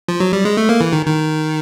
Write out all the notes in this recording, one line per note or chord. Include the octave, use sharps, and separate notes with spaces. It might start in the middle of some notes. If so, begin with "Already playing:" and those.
F3
F#3
G3
G#3
A3
A#3
E3
D#3
D#3